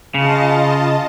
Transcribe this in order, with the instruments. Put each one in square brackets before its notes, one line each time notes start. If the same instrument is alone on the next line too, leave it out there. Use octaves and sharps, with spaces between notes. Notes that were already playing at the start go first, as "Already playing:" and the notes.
[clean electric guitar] C#3 [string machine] F4 D#5 A5